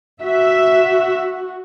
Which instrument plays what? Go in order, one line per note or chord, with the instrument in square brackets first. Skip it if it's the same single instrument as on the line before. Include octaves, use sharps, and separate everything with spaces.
[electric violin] F#4 [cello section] E5